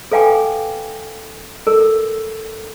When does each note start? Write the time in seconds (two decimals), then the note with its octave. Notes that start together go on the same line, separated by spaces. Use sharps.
0.12 A4 B4 F5 G5 G#5 D6
1.67 A4 A#4 E6